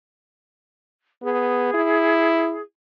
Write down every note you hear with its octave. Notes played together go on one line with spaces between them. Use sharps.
B3 G#4
E4